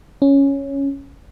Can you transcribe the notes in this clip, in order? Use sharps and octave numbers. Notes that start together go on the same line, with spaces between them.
C#4